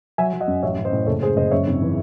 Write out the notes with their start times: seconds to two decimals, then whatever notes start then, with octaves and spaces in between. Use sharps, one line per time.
0.18 F#3 E5 G#5
0.33 F#3
0.40 D#5 F#5
0.47 F#2
0.63 A1 C#5 E5
0.78 A1
0.85 C5 D#5
0.93 A2
1.07 F#1 A4 C#5
1.22 G#3 G#4 C5
1.37 F#1 C5 D#5
1.51 F#2 C#5 E5
1.67 G#1
1.82 E3